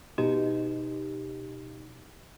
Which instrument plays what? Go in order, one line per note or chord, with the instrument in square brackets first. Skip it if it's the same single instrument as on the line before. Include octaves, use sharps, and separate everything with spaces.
[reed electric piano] B2 [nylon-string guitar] D#4 [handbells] G4